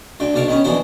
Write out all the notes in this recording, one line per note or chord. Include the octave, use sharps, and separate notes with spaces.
D2 D3 G5
B1 A#3 D4 F5 C#6
D#3 B3 C#4
A#1 B2 D3 E3 F#4 C5